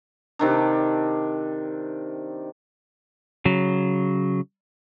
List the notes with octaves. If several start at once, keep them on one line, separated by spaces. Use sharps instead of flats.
C3 D#3 D4
C#3 F#3